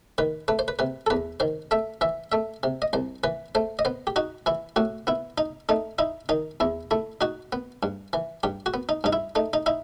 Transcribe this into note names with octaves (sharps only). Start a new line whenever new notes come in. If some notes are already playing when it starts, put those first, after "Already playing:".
D#3 B4
A3 B4
C5
B4
C3 B4
A4
E2 B4
D#3 C5
A3 E5
E3 E5
A3 E5
C3
D#5
C2 C5
E3 B4
A3 C5
D#5
B3 C5
G4
D#4 F#4
E3 E4
A2 F#4
B3 E4
D#4
A3 D#4
D#4 E4
D#3 D#4
E2 E4
A3 E4
D#4 F#4
B3
G2
E3
G2 G4
F#4
B3
D#4
G2 D#4
E4
A3 D#4
D#4
D#4 E4